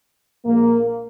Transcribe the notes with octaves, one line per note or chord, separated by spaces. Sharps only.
A#1 A#2 G#3 A#3